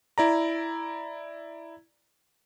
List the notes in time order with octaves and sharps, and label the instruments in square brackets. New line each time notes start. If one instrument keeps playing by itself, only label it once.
[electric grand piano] E4 D5 A#5